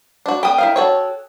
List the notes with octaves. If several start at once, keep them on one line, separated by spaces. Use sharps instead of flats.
D4 F#4
B3 G5 D#6
E4 A#4 F5
F#4 A4 C#5